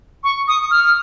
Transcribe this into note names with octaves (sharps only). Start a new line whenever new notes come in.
C#6
D#6
F6